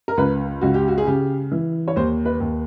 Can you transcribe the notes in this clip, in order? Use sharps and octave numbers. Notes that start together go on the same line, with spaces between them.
A#4
C#2 B4
C#2 F#4
G4
F#4
G#4
C#3 G4
E3
C#5
D#2 C5
B4
D#2